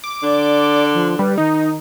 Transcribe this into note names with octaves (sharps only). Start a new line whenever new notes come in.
D6
D3 D5
F3
G3 B4
D#3 D#4